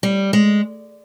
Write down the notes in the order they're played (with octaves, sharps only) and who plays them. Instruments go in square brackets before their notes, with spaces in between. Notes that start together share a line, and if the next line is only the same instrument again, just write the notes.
[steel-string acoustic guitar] G3
G#3